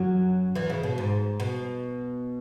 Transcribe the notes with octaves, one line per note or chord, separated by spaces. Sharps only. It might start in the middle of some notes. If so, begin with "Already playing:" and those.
Already playing: F#2 F#3
E2 E3
C#3
B2
G#2
B2